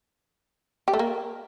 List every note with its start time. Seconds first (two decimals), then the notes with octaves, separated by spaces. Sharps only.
0.88 G4
0.94 A3
0.99 A#3